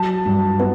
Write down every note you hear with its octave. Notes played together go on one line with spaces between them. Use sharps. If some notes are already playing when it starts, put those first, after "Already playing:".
Already playing: F#3 A5
G2
B3